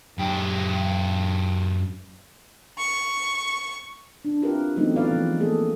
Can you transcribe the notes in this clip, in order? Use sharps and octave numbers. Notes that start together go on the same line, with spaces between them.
F#2 G4
C#6
D4
C4 E4 F4 G4 A#4 B4
E3 F#3 A3 B3 C4 D#4
C4 F4 B4 D5 F5
E3 F3 G#3
A3 A#3 G#4 A4